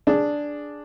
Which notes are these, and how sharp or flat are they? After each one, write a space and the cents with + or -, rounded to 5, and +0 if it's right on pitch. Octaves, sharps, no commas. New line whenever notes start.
D4 +0 G#4 +0